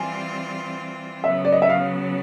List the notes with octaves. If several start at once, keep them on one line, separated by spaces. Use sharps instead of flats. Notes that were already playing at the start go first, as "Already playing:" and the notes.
Already playing: E3 G3 C4 F4 G#5
C#3 F#3 B3 E5
D5
D#5
E5
F5